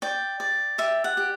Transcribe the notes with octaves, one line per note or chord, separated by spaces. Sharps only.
D5 G5
D5
G4 E5
F#5
G4